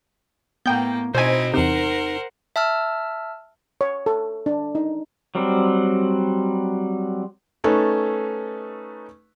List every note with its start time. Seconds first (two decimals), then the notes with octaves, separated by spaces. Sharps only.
0.66 A2 A#3 B3 G5 G6
1.15 B2 C4 D#4 E4 C5 G#5
1.54 E2 C3 D#4 A#4 C5 F#5
2.56 E5 A5 E6 F6
3.81 C#5
4.06 A4
4.46 D4
4.75 D#4
5.35 F#3 G3 C4
7.64 A3 C#4 D#4 A4 B4